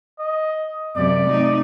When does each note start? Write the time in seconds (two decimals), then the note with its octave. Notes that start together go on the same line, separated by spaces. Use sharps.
0.19 D#5
0.96 F#2 C3 G#3 D5
1.27 A3 D#4